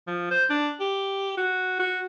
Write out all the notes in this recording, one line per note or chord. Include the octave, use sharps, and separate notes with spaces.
F3
C5
D4
G4
F#4
F#4